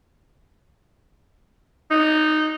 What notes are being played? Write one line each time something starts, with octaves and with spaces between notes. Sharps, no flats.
D#4